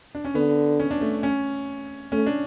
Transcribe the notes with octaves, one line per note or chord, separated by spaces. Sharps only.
D4
C#4
D3 B3
C#4
D4
A3
C#4
A3 C#4
D4